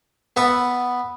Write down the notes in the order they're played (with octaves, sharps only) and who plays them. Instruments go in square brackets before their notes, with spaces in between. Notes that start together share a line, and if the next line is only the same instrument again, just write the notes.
[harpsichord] B3 B4 E5 F#5 A5 B5